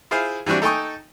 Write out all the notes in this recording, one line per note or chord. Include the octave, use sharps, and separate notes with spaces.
E4 F4 G#4 C5 F5
E3 G3 C4 D4 F#4
D#4 A4 G5 G#5 C#6 D#6